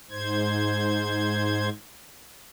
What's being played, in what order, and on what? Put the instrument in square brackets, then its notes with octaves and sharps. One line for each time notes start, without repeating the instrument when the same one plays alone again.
[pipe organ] G#2 C5 G#6